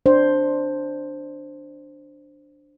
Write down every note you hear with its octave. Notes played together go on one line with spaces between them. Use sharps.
D4 C5